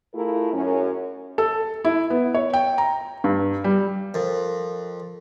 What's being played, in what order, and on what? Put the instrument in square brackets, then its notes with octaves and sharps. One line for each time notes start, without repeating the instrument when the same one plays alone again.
[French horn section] A3 E4 F4 G#4 A#4
F#2 C#4
[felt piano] A4
E4
B3
C#5
G5
A#5
G2
G3
[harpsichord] F2 [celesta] A#4